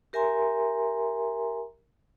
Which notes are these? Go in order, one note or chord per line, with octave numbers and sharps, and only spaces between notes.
G4 A#4 E5 G#5 A#5 C6